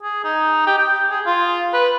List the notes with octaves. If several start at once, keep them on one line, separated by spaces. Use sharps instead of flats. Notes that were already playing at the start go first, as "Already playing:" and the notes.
G#4
D#4
G4
G5
G#4
F4
B4